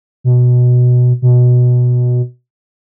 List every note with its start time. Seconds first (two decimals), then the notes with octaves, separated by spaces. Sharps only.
0.24 B2
1.22 B2